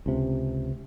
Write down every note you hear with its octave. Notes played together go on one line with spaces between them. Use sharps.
C#2 C3